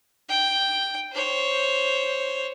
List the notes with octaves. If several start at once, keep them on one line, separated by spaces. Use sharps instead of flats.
G5
C5 C#5